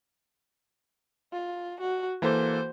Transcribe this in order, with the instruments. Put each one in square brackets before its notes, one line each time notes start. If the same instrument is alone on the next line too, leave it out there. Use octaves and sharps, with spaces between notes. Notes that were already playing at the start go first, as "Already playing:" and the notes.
[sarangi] F4
F#4
[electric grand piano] E3 A#3 A4 [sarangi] C5